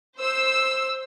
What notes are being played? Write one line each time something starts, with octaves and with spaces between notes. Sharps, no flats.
C5 E6